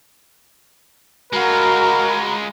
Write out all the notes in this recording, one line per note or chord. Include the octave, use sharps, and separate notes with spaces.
G#3 F4 F#4 A#4 A#5 B5